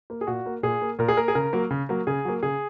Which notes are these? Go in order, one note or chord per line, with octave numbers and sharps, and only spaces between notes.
A#3
G#4
A#2 F#4
A#3
A#2 G#4
A#3
A#2 A#4
G#4
A#3 A#4
G#4
C#3 A#4
F#3 A#3
C#3
F#3 A#3
C#3 G#4
F#3 A#3
C#3 G#4